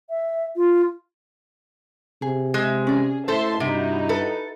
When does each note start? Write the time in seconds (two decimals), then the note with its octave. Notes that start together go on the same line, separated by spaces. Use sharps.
0.10 E5
0.56 F4
2.22 C3 G#4
2.54 G#3 E5
2.87 C#4 G#4 D5
3.28 A2 A4 C5 E5 A5 C6
3.60 G2 C3 D#4 E4 F#4
4.09 A4 B4